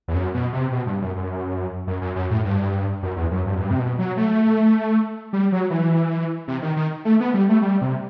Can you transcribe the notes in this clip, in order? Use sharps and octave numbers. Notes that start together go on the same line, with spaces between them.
E2
F#2
B2
C3
B2
G2
F#2
F#2
F#2
F#2
F#2
A2
G2
F#2
E2
F#2
G2
F#2
G2
C3
B2
F#3
A3
G3
F#3
E3
C3
D#3
D#3
A3
B3
G3
A3
G3
C3